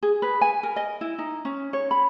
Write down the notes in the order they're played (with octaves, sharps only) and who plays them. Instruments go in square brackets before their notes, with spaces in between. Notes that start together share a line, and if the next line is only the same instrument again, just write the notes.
[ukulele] G#4
B4
G#5
A#4
D#5
E4
D#4
C#4
C#5
B5